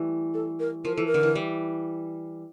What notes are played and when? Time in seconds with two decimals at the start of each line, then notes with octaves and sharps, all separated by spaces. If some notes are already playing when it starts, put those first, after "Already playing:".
Already playing: E3 G3 A3
0.34 A4
0.60 A#4
0.85 F3 A#4
0.96 E3 A4
1.06 A#4
1.14 D3
1.23 E3
1.35 G3